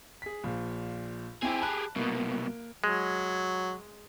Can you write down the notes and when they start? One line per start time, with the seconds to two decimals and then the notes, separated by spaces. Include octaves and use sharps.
0.22 G#4 B6
0.44 A#1 A#2
1.43 C4 E4 G4 G#4
1.62 A5 B5 F#6
1.96 C2 B2 A#3
2.84 F#3 G#3